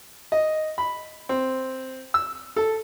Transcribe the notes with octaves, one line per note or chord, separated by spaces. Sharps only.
D#5
B5
C4
E6
A4